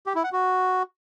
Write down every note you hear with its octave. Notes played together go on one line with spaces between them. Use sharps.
G4
E4
F#5
F#4